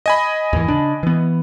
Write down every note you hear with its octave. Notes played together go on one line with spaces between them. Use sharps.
D#5 G#5 B5
D#2 G#2 E3
C#3 D4
E3 B3